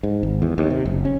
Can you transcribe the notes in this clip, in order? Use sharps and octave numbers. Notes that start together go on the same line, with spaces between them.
G#2
G#1
E2
D#2
C3
F#1
C#4